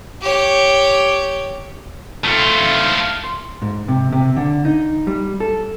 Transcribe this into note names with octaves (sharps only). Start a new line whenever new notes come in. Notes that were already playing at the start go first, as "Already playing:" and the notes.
G4 C#5
A3 F4
C6
G#2
C3
C3
D3
D#4
G3
A4